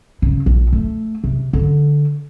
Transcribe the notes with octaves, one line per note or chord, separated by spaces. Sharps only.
C#3
A#1
A3
C3
D3